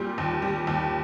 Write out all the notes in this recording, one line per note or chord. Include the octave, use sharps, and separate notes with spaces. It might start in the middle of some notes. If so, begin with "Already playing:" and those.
Already playing: A#2 G3
D#2
G3
D#2